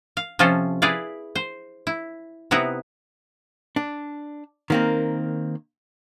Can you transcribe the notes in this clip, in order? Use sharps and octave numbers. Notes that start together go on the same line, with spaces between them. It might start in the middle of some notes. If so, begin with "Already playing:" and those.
F5
C3 F3 C#4 F4 A4 C5
E4 G#4 B4 D5 F5
C5
E4
C3 B3 D#4 E4 F#5
D4
D#3 A#3 C4